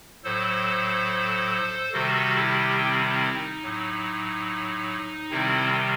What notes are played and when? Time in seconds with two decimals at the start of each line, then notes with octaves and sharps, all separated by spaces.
0.24 A2 F#3 A4 C5
1.93 C3 D#3 G3 F#4 A4
2.36 E4 G4
2.78 C4 E4
3.06 C4 E4
3.35 D#4
3.63 A2 F#3
5.31 C3 D#3 G3 C4 E4